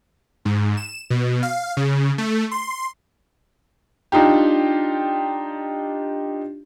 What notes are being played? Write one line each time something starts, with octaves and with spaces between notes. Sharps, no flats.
G#2
E7
B2
F5
C#3
A3
C6
D4 D#4 F4 G4